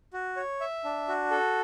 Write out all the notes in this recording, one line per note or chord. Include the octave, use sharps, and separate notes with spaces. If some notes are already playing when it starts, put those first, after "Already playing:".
F#4
C#5
E5
D4
F#4
A4